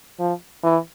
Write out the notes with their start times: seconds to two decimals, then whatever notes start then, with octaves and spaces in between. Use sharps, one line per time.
0.20 F3
0.64 E3